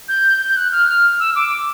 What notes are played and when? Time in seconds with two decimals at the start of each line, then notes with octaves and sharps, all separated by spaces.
0.09 G6
0.49 G6
0.56 F#6
0.72 F6
1.20 E6
1.36 D6